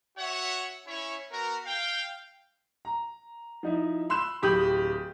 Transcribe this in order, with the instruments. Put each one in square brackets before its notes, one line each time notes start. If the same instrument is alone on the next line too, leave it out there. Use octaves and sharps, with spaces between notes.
[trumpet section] F#4 C#5 E5 F#5
C#4 E4 C#5
B3 F#4 A#4
F5 G5
[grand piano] A#5
F3 D#4 E4
B5 C6 E6 F#6 E7
D1 G4 B5 D#6 G6 F#7